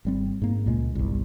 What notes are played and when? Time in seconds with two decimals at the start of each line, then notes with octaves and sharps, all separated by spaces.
0.05 G#1 G3 C4
0.42 G#2 A#3
0.66 C#2 A#2 G#3
0.95 G1 C2